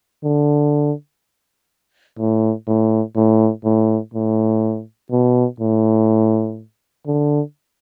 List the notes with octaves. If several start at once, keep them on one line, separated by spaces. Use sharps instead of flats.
D3
A2
A2
A2
A2
A2
B2
A2
D3